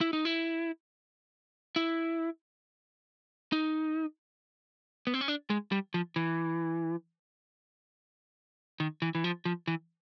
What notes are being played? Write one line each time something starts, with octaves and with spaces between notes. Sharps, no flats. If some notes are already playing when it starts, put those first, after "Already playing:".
E4
D#4
E4
E4
D#4
B3
C4
C#4
D4
G#3
G3
F3
E3
D#3
E3
E3
F3
F3
E3